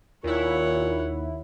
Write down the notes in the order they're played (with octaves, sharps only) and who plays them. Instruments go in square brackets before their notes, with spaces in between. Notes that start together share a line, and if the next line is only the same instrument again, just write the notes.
[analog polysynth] D#2 E4 [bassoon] A#2 [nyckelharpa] C#5 F#5